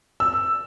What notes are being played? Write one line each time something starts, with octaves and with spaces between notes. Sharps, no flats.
E6